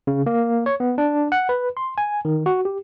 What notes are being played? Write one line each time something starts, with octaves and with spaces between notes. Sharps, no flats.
C#3
A#3
C#5
B3
D4
F#5
B4
C6
G#5
D#3
F#4
G4